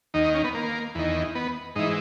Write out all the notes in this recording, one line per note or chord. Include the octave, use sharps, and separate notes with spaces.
D#2 D#3 D#4
D#4
C#4
B3
A#3
E2 D#3
B3
G#2 E3 D#4